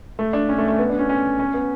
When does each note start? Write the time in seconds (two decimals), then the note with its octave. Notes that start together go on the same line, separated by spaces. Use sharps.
0.19 A3
0.33 D4
0.49 C#4
0.58 A3
0.68 A3
0.79 B3
0.89 D4
0.99 C#4
1.09 C#4
1.39 C#4
1.54 B3